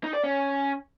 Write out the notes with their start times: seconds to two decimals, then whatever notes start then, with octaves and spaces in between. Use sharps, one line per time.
0.04 D#4
0.14 D5
0.24 C#4